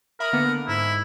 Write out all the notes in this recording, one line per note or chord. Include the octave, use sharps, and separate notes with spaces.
A#4 E5 B5 D#6
D3 A#3 B3
G#2 E4